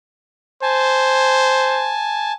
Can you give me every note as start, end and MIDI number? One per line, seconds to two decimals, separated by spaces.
0.62 1.94 72
0.62 2.32 80
0.62 2.32 81